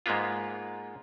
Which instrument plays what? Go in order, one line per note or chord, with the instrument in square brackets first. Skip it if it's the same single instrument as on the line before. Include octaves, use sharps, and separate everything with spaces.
[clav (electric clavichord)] G#2 G#3 A#3 B3 F4